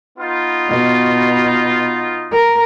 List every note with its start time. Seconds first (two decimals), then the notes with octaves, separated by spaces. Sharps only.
0.19 B3 D#4 F4
0.69 B2
2.31 A#4